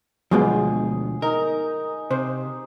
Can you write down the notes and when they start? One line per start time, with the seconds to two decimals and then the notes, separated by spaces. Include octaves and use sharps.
0.31 D2 B2 F3 F#3 G#3 B3 G#4
1.22 D#4 A#4
2.11 C3 C5